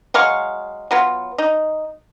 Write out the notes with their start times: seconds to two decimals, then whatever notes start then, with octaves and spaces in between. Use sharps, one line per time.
0.14 F#3 G#3 F5 C#6
0.91 F#3 B3 F4
1.38 D#4